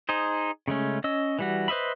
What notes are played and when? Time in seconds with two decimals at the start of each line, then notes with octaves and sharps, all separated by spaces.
0.09 D#4 G#4 C5
0.68 C#3 G#3 A3 C#4
1.04 C#4 D#5 E6
1.39 E3 G3 F#4
1.68 B4 C5 D#5 E5 B5